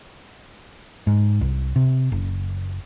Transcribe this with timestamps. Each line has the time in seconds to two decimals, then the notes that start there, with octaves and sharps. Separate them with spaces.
1.07 G#2
1.41 C2
1.76 C3
2.12 F#1